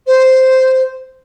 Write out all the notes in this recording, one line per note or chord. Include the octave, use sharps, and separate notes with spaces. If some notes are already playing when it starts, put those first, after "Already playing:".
C5